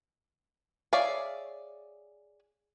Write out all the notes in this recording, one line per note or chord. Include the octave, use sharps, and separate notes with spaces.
G#4 C#5 D5 E5 F5